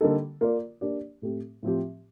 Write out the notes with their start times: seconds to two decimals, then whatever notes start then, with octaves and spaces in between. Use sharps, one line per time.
0.01 D3 G3 A#3 D#4 A4
0.41 A#3 F4 A#4 D5
0.81 A#3 D4 G4 D5
1.22 A2 A3 C4 G4
1.63 A2 F3 C4 G4